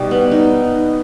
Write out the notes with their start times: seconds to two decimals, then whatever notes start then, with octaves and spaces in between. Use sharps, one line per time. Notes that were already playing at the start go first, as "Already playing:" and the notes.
Already playing: B2 G3 D#4
0.11 B3
0.31 D#4